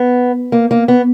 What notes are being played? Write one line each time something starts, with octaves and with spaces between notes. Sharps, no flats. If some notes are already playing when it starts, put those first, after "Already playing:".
Already playing: B3
A#3
A#3
B3